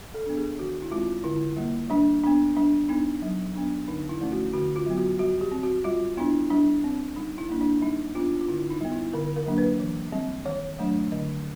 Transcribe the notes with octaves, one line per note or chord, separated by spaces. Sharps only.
A4
B3 D4
G#4
D#3 F#4
E4
G#3 C4 F4
D3 E4
G3 A#3
G3 D4
B3 D4
G3 D4
B3 D4 D#4
F#3
B3 D4
D3 D#4
E4
F3 A3 C#4
F#4
D3 F#4
F4
F#3 B3
F#4
G3 F#4
G4
C4
F#4
G3 F4
B3 D4 E4
G3 D4
C4
G3 D#4
E4
A#3 D4
D4
G3 D#4
B3 D4 F4
F4
D3 E4
D#4
G3 B3
E4
D3 A#4
A#4
F#3 A#3 D4
B4
E3
G3 C4
D#3 C#5
F#3 A3 D4
D3 D#5